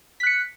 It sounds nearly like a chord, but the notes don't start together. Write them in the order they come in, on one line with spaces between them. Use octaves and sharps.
B6 F#6 C#7